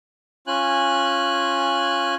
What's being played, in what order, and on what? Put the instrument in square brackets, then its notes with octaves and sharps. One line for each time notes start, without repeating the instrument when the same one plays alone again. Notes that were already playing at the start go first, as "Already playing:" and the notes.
[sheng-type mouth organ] C#4 F4 G#5 F#6